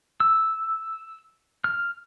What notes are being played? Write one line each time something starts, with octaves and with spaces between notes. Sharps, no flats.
E6
F6